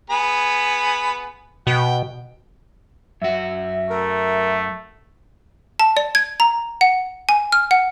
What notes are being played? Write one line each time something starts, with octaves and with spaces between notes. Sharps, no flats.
B3 G#4 B5
B2 G5
F#2 F#4 E5
A3 A#4
A5
D5
G#6
A#5
F#5
G#5
F6
F#5